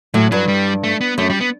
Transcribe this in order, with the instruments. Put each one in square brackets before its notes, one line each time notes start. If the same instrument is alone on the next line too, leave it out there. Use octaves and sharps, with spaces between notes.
[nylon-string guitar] A2 [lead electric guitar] F#3
[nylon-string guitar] G2 [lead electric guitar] F#3
[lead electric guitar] G3
A3
B3
[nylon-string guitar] F#2 [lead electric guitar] A3
[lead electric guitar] G3
B3